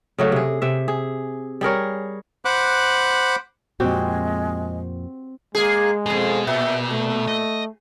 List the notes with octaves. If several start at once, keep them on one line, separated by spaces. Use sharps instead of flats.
C#3 F#3 A3
C3 G#4
C3 E5
G#4
G3 G#4 A#4 C#5
C5 F#5 B5 D6 F#6
F2 A#2 G#3 C4 F#4 G4
G#3 A#3 G#4
F2 B2 G#4
A#2 E5
A3
D#5